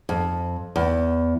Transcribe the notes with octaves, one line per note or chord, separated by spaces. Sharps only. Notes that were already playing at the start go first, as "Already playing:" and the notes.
F2
E2